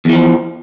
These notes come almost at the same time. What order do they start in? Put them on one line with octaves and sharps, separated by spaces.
E2 E3 F3